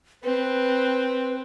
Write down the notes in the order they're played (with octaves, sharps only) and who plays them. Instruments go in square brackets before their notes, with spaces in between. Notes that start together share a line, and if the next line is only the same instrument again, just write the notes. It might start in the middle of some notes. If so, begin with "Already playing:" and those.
[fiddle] C4 [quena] B4